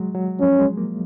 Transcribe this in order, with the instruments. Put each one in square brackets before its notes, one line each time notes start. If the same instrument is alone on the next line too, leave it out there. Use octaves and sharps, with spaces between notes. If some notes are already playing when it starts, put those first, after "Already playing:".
Already playing: [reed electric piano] F#3 G#3
F#3
[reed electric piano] F3 [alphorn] C#4
[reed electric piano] G#3
A#3